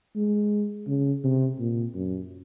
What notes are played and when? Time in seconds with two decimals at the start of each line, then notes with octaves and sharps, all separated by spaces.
0.16 G#3
0.87 C#3
1.24 C3
1.59 A#2
1.95 F#2